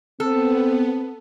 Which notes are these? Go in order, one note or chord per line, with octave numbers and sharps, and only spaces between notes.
B3 C4 A4